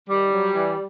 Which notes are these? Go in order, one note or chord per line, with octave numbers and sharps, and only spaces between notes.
D#3 G3
F#3
E3